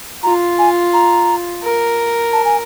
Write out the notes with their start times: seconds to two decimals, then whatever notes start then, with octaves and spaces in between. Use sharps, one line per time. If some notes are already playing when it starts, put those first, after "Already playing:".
0.23 F4 A#5
0.59 G#5
0.93 A#5
1.63 A#4
2.33 A5
2.45 G#5